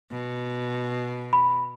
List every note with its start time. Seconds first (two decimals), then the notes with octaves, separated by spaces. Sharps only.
0.12 B2
1.33 B5